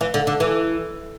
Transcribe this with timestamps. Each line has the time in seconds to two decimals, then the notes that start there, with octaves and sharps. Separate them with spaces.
0.01 E3
0.14 D3
0.27 D3
0.40 E3